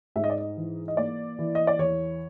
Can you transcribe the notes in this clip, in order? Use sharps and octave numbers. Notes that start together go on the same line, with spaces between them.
G#2 E5
D#5
D5
D#5
E3
D#5
A#3 D5
E3
D#5
D5
E2 C#5